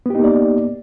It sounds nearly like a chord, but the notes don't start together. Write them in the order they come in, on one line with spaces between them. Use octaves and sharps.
B3 G4 D#4 A#3 D5